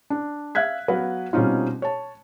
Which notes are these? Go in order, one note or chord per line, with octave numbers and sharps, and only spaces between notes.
D4
E5 F5 F#6 G#6 B6
F#3 B3 B4 F5
B2 G3 C4 C#4 D#4 F4
C#5 A5